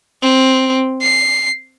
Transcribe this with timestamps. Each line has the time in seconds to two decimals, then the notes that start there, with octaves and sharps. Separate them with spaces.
0.22 C4
1.02 C7